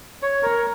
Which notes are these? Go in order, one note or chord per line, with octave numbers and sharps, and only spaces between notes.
C#5
A#4